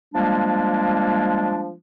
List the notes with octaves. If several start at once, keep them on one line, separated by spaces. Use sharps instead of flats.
F3 G3 G#3 A#3 D4